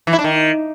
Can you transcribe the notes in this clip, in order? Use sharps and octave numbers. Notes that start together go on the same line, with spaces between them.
E3
E4
D4
D#3